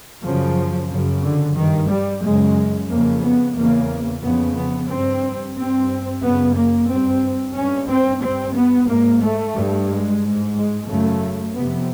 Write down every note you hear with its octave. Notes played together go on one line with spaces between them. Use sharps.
F#2 C#3 F3
F#2 C#3
D3
G2 D#3
G3
F#2 C#3 G#3
F2 C#3 A#3
B3
E2 C#3 A#3
F2 C#3 B3
B3
G2 C4
G2 C4
F#2 C#3 B3
A#3
G2 C4
G2 C#4
C4
G2 C4
B3
G#2 A#3
A3
G2
G#3
G#2
G#3
F#2 C#3 A3
F2 C3 B3